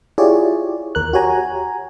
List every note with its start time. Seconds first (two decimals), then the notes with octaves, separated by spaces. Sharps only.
0.18 E4 F4 G4 G#4 C#5 D5
0.95 D#2 A#4 F#6
1.13 F#4 G4 C#5 G#5 A#5